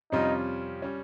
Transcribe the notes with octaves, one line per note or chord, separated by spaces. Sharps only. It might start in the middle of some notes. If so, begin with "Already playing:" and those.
F2 C3 G3 C#4 D#4 F4
G3 C#4